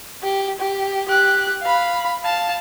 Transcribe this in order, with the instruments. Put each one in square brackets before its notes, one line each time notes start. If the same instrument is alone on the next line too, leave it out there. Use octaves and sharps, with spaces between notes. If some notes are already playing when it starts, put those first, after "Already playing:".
[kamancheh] G4
G4
G4 F#6
F5 B5
F5 A5